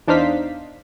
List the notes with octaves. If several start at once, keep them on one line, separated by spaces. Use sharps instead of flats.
E2 D4 D#4 C5 F5 B6